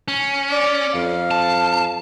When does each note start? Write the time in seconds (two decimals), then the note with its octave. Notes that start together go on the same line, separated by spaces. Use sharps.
0.08 C#4
0.52 D5
0.93 F2 F5
1.31 A5